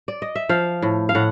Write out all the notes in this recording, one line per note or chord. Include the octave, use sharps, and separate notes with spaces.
D5
D#5
E5
F3 F5
A2
F5
A2 F#5